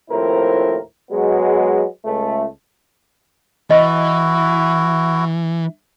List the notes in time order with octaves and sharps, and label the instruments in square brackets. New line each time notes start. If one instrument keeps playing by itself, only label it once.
[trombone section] D#2 A2 F3 C4 E4 A#4
F#3 G#3 B3
C#2 A3
[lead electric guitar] E3 [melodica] E4 F#4 [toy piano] D#5